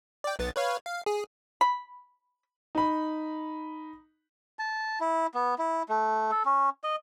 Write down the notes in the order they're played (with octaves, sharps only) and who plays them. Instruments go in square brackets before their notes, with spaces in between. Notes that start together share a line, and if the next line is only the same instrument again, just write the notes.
[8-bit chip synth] D5 G5
B1 B3 A6
B4 C#5 F5
F5
G#4
[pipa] B5
[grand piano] D#4 B5
[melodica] A5
E4
B3
E4
A3
A4
C#4
D#5